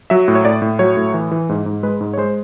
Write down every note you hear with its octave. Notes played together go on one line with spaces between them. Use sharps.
F#3 E5
A2
C#5
A2 D5
A2
F#3 C#5
A2
E3
E3
G#2
G#2
G#3 B4
G#2
C#5
G#3 C5